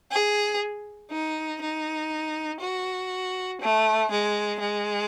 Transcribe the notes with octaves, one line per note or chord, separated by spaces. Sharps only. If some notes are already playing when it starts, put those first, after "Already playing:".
G#4
D#4
D#4
F#4
A3
G#3
G#3